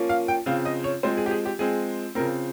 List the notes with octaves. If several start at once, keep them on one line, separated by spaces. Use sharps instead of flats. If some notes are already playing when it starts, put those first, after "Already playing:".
Already playing: F3 A#3 C#4
F5
G5
C#3 F3 C4 F5
D#5
C#5
F3 G#3 C4 C5
G#4
G4
G#4
G4
F3 G#3 C4 G#4
C#3 F3 C4 A#4